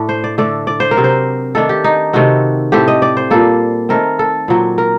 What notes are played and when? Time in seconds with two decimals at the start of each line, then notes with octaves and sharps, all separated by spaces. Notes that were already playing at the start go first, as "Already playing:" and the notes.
Already playing: A2 A3 D4
0.09 C5
0.24 D5
0.38 D3 A3 D4 D5
0.67 D5
0.80 C5
0.91 A#4
0.96 C3 F#3 C4
1.04 C5
1.55 D#3 A3 D4 A4
1.69 G4
1.84 D#4
2.13 C3 D#3 A3 C4 F#4
2.72 A2 A3 C4 G4
2.88 D#5
3.02 D5
3.17 C5
3.31 A#2 G3 A#3 A4
3.89 D#3 A3 C4 A#4
4.19 A4
4.48 A#2 F#3 C4
4.78 A#4